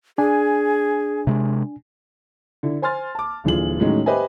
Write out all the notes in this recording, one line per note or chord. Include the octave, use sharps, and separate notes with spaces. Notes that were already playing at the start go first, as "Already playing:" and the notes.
D4 G#4 G#5
C3 G#3
D3 E4
C5 G#5 C6 F6 A6
A5 D6
D#1 D3 E3 F4 G#4 F#7
A2 D#3 F#3 G#3 C#4 D#4
G4 B4 C5 D#5 E5 G#5